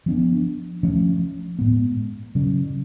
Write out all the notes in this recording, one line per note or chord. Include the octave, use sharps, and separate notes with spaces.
F3 B3 D4
F3 A3 C#4
A2 G#3 B3
C#3 F#3 C#4